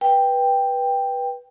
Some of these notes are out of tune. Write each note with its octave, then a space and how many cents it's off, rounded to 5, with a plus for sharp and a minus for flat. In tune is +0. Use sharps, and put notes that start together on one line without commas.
B4 -15 G5 +5